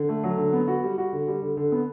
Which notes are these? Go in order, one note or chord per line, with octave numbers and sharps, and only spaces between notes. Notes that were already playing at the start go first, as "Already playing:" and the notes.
Already playing: D3
A3
F#3
D3
B3
F#4
G3
F#4
D3
G3
D3
D3
B3